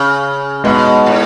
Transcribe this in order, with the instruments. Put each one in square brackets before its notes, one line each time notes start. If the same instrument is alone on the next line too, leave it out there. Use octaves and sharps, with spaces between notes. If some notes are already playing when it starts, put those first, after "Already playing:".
Already playing: [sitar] C#3
[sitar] B2 [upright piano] G#3 B3 D#4
[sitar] A2